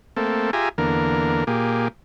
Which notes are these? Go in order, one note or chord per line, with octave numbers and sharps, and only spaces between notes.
A3 A#3 C4 A4
F4 G4 G#4 E5 G#5 A#5
E2 D3 A#3 A#4
A#2 A#3 G4 G#4